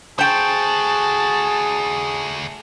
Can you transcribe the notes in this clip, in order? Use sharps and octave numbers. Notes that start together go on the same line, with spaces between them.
A3 F#4 G#4 C5 G5 A5